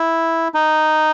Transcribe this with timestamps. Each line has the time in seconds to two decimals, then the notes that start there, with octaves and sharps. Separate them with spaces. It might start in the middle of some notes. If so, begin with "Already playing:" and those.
Already playing: E4
0.54 D#4